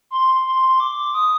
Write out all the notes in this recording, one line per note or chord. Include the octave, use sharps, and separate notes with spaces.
C6
C6
D6
D#6